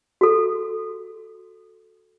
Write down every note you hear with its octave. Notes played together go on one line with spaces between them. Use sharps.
F#4 A4